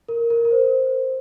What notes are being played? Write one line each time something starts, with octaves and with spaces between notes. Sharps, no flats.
A#4
A#4
A#4
C5